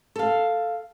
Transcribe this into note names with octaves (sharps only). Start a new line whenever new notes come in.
A4 F5